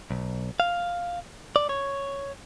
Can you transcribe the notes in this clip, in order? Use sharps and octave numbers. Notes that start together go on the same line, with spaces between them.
B1
F5
D5
C#5